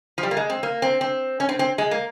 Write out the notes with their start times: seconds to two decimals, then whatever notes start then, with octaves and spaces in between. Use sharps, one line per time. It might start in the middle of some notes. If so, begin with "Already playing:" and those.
0.18 F3
0.23 G3
0.31 A#3
0.37 G#3
0.50 C4
0.63 A#3
0.82 C4
1.01 C4
1.40 C#4
1.49 C4
1.59 C4
1.78 G#3
1.91 A#3